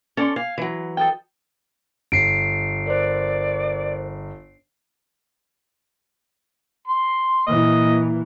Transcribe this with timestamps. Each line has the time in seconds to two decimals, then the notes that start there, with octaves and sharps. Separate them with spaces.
0.17 C#4 A4 D5 C6
0.36 F5 G#5
0.58 E3 F#3
0.97 A4 D#5 G5
2.12 G1 C7 D7
2.87 A#4 C5 D5
6.88 C6
7.47 A#2 E3 D#5